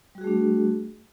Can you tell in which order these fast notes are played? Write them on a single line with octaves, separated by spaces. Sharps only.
G3 F#4 G#4 A3 D4